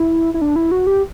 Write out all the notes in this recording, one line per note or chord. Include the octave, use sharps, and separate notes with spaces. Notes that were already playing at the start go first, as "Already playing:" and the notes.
Already playing: E4
E4
D4
E4
F#4
G4